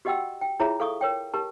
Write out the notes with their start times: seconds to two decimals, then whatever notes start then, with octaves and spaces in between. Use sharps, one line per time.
0.05 F#4 G4 D#5 F#5 G5 E6
0.41 G5
0.60 E4 F4 G#4 C#5 E5 A#5
0.80 A4 F5 C#6 D#6
1.01 A#4 C#5 G5
1.34 G4 A#4 A5